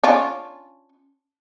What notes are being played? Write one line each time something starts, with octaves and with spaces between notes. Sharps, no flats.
C#4 D4 F4